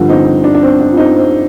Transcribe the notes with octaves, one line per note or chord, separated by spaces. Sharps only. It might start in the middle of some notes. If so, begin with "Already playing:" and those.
Already playing: G2 D3 F3
C4 D#4
D4
D4
C4
D4
F4
C4 D#4
C4